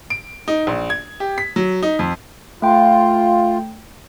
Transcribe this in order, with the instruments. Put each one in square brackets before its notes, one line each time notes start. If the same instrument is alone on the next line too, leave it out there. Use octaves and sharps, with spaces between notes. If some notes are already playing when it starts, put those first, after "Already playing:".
[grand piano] D7
D#4
A#1
G#6
G4
B6
F#3
D#4
F2
[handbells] A3 G5 [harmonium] F4